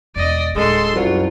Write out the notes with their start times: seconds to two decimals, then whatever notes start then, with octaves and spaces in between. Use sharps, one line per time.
0.16 E1 D#3 D5 D#5
0.56 D1 D2 G#3 A4 C6
0.96 C2 F#2 C3 F4 F#4